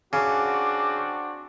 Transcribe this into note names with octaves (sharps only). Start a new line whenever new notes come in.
C#3 C4 D4 F#4 D6